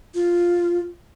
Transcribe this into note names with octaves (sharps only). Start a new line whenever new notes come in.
F4